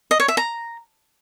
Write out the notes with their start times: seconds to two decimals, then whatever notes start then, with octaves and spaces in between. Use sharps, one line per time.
0.11 D#5
0.20 C#5
0.28 E5
0.37 A#5